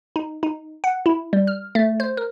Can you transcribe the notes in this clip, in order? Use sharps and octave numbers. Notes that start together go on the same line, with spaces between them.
D#4
D#4
F#5
E4
G3
F6
A3
C5
A#4